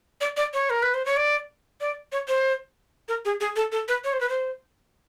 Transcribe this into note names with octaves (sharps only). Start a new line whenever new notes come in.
D5
D5
C#5
A#4
B4
C5
C#5
D5
D5
C#5
C5
A#4
G#4
G#4
A4
A4
B4
C#5
C5
B4
C5